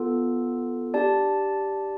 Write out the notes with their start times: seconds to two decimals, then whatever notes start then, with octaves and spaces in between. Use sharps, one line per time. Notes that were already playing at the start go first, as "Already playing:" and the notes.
Already playing: B3 F4 A4
0.94 D4 G4 D5 A5